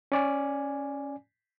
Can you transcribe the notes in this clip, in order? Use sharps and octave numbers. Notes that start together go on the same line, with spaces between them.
C#4 D5 G#5